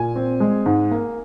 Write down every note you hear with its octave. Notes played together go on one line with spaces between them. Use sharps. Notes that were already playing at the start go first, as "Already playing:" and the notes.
Already playing: A#2 G#5
C4
G#3
G#2
A#3